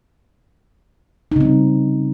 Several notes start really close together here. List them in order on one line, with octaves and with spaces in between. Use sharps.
D#4 C#3 C4 G3